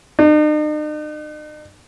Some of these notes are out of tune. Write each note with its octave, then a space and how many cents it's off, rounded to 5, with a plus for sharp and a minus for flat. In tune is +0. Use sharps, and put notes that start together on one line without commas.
D#4 -45